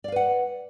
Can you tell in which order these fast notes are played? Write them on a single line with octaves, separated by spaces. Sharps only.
D5 F5 B4 F#5